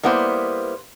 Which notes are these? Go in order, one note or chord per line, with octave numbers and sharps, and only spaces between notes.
G3 A#3 B3 E4 C5